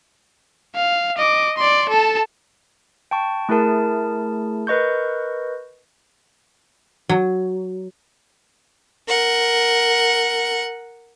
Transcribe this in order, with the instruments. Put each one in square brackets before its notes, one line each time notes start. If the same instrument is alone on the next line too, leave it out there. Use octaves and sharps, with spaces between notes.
[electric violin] F5
D#5 D6
D5 C6
A4 A5
[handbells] G5 A5 C#6
A3 E4 G#4 A#4 A5
A#4 B4 D#5 C#6 G6
[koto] F#3
[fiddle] A#4 F#5